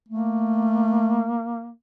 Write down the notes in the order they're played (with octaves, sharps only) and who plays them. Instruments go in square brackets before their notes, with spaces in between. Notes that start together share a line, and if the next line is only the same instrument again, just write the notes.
[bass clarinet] A3 [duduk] A#3